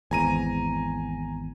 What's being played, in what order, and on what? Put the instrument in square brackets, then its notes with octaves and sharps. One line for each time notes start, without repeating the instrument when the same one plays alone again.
[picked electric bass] G#1 E2 [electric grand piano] G#5 A#5 D#7